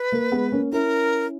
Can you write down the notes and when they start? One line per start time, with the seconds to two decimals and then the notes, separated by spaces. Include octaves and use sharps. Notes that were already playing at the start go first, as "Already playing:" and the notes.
Already playing: B4
0.12 A#3
0.32 G#3 B3
0.52 A#3 C#4
0.72 C#4 E4 A#4